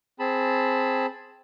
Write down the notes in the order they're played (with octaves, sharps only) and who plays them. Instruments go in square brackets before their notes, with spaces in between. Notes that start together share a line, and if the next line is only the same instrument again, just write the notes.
[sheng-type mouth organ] C4 G#4 A5 B5